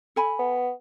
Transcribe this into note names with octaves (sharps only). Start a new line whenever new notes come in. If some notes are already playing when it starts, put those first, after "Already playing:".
A4 G#5 B5
B3